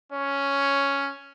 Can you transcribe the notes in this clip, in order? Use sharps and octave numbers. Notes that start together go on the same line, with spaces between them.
C#4 C#5